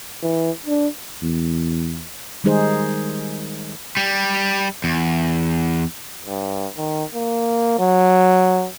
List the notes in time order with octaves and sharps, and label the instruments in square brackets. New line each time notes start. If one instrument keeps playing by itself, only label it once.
[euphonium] E3
D4
[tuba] E2
[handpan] D#3 G3 G#3 D#4 G#4 C5
[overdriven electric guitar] G3
E2
[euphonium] G2
D#3
A#3
F#3